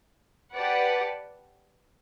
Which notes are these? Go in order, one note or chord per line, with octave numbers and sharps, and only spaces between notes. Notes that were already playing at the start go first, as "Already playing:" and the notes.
G4 B4 D5 F#5 A5